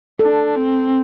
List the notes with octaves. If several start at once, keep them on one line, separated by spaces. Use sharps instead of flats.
D4 A4
C4